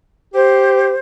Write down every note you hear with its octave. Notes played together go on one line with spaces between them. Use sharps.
G4 C5